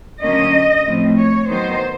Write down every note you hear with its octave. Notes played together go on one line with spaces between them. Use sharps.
D3 F#3 A#3 C#4 D#5
A2 F3 A3 C4
C#5
D#3 F#3 B3 D#4 C5